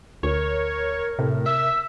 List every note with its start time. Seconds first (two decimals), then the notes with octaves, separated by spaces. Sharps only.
0.23 D2 A#4 C#5
1.19 A2 C3
1.46 E5 E6